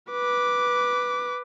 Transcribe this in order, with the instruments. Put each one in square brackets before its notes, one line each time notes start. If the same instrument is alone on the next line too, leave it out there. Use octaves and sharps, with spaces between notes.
[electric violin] B4 D6